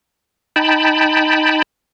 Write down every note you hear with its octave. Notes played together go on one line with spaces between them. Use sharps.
D#4 G5 A5 B5